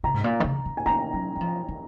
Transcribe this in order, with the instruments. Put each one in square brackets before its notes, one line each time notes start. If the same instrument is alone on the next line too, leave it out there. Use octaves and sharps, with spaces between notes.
[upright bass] C#3 [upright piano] A#5
[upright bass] G#2
A#2
D#3
C#3
D#3
[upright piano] G#5
[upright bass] D#3 [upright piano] A#5
[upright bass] F#3
F#3
F3
D#3